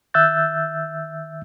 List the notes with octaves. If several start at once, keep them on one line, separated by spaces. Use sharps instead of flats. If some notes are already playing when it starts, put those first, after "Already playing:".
D#3 E5 E6 F#6 G6 A6